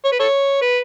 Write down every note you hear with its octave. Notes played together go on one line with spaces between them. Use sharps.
C#5
B4
A4 C#5
B4